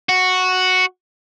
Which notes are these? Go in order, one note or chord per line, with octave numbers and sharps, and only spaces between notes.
F#4